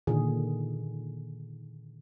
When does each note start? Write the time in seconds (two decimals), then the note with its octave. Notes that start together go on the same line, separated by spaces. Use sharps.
0.07 A#2 D3 D#3 G#4